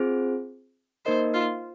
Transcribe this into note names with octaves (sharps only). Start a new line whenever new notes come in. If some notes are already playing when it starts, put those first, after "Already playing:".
Already playing: C4 F4 G#4 C5
A#3 D#4 A#4 C5 D#5
F4